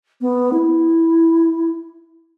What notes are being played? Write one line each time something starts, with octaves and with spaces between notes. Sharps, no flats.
B3
E4